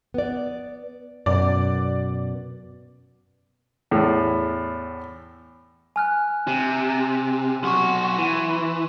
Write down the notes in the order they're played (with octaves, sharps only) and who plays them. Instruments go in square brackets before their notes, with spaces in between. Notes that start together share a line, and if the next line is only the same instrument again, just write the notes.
[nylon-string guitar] B3 D5
[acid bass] F#2 [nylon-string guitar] B2 [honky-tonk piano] D5
[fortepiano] E2 A2
[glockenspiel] G#5 F6 F#6
[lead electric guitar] C3
[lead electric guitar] B1 F#4 [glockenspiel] C6 C#6
[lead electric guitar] E3